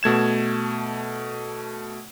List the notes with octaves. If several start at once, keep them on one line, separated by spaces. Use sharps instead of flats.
B2 A3 G#6 E7